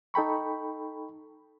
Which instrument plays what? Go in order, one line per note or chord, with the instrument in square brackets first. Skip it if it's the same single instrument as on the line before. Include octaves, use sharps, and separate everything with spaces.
[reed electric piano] D#4 A4 G5 B5 C#6